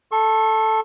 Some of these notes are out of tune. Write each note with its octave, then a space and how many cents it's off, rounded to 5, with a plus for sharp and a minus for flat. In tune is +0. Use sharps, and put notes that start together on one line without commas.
A4 +0 C#6 -40